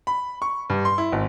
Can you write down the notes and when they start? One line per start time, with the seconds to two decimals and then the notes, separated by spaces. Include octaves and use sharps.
0.07 B5
0.42 C#6
0.70 G2
0.85 C6
0.98 E4
1.12 G#1